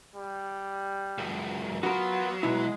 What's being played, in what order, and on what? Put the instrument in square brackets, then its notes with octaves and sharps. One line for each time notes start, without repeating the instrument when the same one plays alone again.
[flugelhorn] G3
[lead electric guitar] C#2 F#2
[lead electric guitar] F#3 [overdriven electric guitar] B3 B5 [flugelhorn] F4 [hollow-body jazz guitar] F#4 A#4
[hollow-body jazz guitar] B2 E4 [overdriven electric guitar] G#3 [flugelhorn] B4